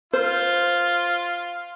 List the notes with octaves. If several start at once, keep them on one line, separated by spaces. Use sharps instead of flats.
F4 C5